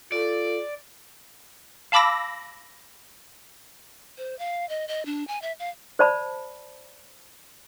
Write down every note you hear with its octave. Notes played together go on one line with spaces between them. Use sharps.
F4 A4 D5
F5 A5 B5 D6 E6 A#6
C5
F5
D#5
D#5
D4
G#5
E5
F5
C5 D5 A5 B5